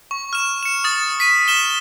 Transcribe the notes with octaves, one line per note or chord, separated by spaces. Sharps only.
C#6
F6 E7
C#7 E7
D#6 A6
B6 D#7
F6 E7 G7